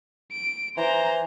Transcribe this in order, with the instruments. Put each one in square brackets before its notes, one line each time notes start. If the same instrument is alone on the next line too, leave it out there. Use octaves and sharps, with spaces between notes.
[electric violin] D7
[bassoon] E3 [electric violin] C5 A#5